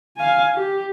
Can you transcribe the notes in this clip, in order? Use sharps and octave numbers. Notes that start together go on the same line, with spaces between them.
F5 G#5
G4